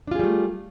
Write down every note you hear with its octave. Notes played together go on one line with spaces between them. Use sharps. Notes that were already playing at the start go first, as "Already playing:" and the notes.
G3 A3 D4 F4 G#4